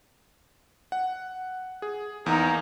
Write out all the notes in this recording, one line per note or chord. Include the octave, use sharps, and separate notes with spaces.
F#5
G#4
E2 A#3 D#4